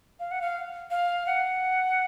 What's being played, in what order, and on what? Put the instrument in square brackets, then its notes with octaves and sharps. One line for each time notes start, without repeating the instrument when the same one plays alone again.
[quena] F5
F#5
F5
F5
F#5